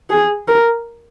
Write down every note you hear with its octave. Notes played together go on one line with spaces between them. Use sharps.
G#4
A#4